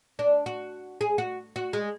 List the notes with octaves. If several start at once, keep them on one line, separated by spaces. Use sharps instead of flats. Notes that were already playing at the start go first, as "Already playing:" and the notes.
D4
F#4
G#4
F#4
F#4
G#3